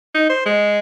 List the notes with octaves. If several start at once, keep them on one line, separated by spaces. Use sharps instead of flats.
D#4
C5
G#3